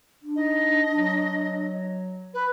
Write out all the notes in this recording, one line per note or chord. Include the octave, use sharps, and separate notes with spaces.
D4
D#4 D#5
F#3
B4